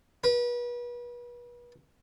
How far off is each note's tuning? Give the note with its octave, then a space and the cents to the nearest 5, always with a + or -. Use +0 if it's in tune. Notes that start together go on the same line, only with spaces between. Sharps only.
B4 -35